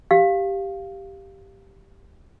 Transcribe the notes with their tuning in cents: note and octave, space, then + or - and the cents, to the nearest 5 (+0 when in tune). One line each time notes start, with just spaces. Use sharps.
G4 +0 F5 +0